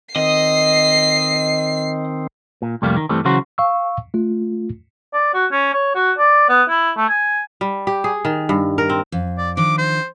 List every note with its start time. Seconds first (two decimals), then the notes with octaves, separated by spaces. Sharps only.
0.16 D#3 C4 D#5 C7
2.62 A#2
2.82 C2 F2 G3 A3 A#3
2.97 D#3
3.09 G2 E3 G3 A3 C4
3.25 C#3 E3 F#3 F#4 C5
3.58 F5 C#6 E6
4.14 A3 F4
5.13 D5
5.34 F#4
5.52 C#4
5.74 C#5
5.95 F#4
6.18 D5
6.49 B3
6.69 E4
6.97 A3
7.09 G#5
7.61 G3
7.87 G4
8.04 G#4
8.25 D#3
8.49 G2
8.78 A#4
8.90 C4
9.12 F2
9.38 D5
9.57 D#3 F3 D4 D6
9.78 C5